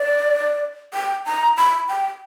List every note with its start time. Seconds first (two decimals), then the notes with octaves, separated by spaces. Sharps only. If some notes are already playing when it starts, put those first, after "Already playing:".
Already playing: D5
0.94 G5
1.26 A#5
1.58 B5
1.89 G5